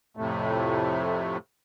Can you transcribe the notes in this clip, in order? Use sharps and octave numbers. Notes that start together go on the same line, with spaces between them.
F2 A2 C3 A3